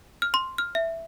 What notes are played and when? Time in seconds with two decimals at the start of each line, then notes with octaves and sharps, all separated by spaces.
0.22 F6
0.34 C6
0.58 F6
0.75 E5